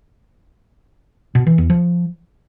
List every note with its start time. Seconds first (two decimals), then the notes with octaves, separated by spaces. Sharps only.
1.35 B2
1.47 E3
1.58 E2
1.70 F3